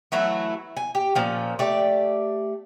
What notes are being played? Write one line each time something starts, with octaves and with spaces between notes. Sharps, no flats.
E3 F#3 A3 E4
G#5
G4
A#2 F3 C#4
A3 G4 D5